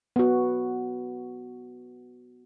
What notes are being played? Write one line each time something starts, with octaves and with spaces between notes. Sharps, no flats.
B3 F#4